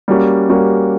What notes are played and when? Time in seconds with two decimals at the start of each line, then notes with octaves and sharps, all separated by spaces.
0.08 G3 A#3 C#4 F#4
0.49 G3 A#3 C#4 F#4